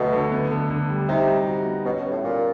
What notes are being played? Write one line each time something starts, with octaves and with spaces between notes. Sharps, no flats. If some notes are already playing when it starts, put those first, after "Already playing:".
Already playing: D2 B2 F#3 A3
D3
B3
D3
D3
G3
C3 D#4
G3
F#4
B3
B2 C#4
G3
A2
A#2 F4